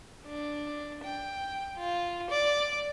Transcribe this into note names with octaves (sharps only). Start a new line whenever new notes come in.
D4
G5
F4
D5